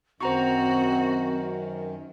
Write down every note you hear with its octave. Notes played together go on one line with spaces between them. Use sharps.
F#2 D#3 C4 F#4 C5 A#5 C#6